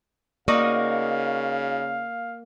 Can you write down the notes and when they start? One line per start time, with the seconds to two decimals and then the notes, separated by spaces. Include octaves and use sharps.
0.48 C#3 A#3 D#4 F#4 A#4 D5 F5